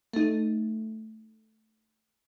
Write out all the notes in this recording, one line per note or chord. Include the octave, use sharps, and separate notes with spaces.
A3 D#4